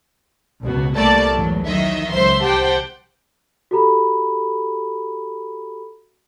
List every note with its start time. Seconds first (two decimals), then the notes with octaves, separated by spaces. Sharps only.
0.63 C#2 B2 F#4
0.96 C2 G3 A3 A#3 D5 A5
1.33 E2 G#2 F#3
1.64 D#3 F#3 D#5 E5
2.13 C#2 F#3 C5 E5 C6
2.43 C2 G4 C5 F#5 G5 A5
3.71 F#4 G4 A4 A#5 B5